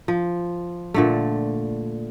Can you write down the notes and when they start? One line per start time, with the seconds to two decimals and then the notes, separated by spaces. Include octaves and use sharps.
0.08 F3
0.94 A#2 D3 A3